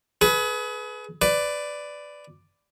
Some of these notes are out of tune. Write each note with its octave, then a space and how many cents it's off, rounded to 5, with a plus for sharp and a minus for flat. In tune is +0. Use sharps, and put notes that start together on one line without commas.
G#4 +35 B4 +0
B4 +20 D5 +0